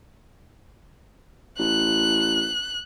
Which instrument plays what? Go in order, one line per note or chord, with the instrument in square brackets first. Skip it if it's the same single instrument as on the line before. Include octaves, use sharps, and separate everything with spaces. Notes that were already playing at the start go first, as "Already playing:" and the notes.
[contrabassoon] A1 [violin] F#6